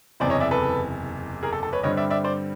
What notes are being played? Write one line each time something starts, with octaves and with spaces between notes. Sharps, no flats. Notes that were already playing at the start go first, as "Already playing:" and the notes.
F#1 E2 C3 C5 D5
C#5 D#5
D5 E5
A4 B4
G#4 A#4
A4
A4
B4 C#5
G2 D3 G3 C4 C#5 D#5
D5 E5
D5 E5
C5 D5